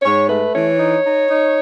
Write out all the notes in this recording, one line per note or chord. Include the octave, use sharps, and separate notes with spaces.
G#2 C#5
A3 B4
E3 C#5
D#4
D#4
D#4